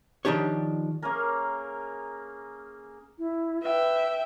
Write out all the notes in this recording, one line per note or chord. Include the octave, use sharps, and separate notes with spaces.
D#3 F3 D4 G4 C#5
A#3 C#4 G#4 A#4
E4
B4 E5 G5